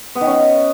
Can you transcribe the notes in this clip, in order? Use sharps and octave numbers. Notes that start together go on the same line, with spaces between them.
B3
D#3
C#4